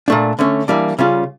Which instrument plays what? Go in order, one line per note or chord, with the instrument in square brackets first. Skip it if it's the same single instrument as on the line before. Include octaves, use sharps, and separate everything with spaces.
[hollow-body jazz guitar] A#2 A3 D4
D3 A3 C#4
E3 G3 A#3 D4
C#3 G3 C#4 F4